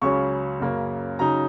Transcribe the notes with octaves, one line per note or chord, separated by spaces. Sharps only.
C#2 C#3 F#3 C#4 C#6
F#2 C#3 A#3 C#4
C#3 F#3 D#4 A#5